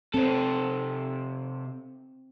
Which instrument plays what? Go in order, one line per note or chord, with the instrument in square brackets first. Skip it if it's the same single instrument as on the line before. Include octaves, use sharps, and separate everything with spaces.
[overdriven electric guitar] C3 A4 [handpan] C4